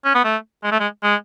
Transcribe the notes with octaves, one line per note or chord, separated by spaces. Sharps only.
C#4
B3
A3
G#3
A3
G#3
G#3